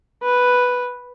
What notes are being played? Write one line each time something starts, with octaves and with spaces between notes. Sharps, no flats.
B4